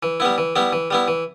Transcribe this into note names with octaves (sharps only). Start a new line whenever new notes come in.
E3
G3 B3 E4
E3
G3 B3 E4
E3
G3 B3 E4
E3